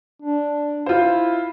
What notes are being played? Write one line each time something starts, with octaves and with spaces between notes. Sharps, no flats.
D4
E4 F4 C5